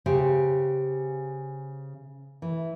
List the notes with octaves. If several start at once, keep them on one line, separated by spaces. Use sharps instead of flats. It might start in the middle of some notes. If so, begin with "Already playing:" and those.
C#3 G4 C5
E3